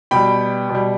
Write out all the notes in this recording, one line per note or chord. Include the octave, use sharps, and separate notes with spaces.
B2 G3 G5 B5
B2
G3